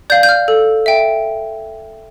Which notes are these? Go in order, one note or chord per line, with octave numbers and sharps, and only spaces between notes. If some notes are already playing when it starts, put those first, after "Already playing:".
D5 F5 G6
G6
F6
A4
E5 G5